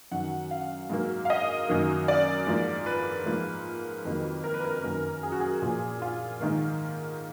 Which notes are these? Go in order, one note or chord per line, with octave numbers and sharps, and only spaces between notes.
F#2 D#3 F#3 F#5
F5
G#2 F#3 A#3
F5
D#5
F#2 D#3 F#3 A#3
D5
G#2 F3 A#3
B4
G#2 F3 A#3
F2 D#3 F#3 A#3
A#4
B4
A#4
F#2 D#3 A#3
G#4
F#4
G#4
A#2 F3 A#3
F4
G#2 D#3 A#3